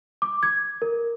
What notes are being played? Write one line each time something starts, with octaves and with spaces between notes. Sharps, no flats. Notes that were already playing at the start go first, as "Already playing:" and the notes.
D6
G#6
A#4